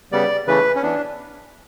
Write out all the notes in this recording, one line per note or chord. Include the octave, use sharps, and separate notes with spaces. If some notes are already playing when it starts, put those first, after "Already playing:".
C#3 G3 B3 D5
C#3 E3 A3 B4
C#4
E3 B3 D4